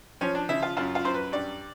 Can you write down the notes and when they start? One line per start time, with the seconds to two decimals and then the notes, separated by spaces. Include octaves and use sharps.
0.21 F3 C#4
0.35 D4
0.49 C#3 E4
0.62 F4
0.77 F#2 F4
0.95 F4
1.04 F#2 C5
1.14 B4
1.32 G2 D5